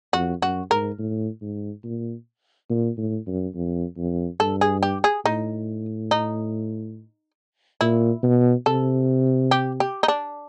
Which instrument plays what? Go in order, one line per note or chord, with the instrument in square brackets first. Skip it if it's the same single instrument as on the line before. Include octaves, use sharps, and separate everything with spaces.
[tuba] F2 [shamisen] F#4
[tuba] F#2 [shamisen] F#4
[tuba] G#2 [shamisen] A#4
[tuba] A2
G#2
A#2
A#2
A2
F#2
F2
F2
[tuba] G2 [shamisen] A4
[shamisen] G#4
G4
G#4
[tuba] A2 [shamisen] D#4
[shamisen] D#4
[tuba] A#2 [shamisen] E4
[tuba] B2
[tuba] C3 [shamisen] A4
[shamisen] G4
G4
D#4
D4